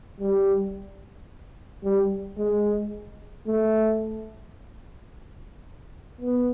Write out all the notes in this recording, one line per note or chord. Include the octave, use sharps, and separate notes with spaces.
G3
G3
G#3
A3
B3